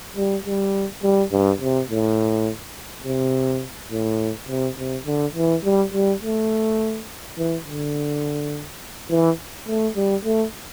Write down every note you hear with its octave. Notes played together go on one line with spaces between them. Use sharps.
G3
G3
G3
G2
C3
A2
C3
A2
C3
C3
D3
E3
G3
G3
A3
E3
D3
E3
A3
G3
A3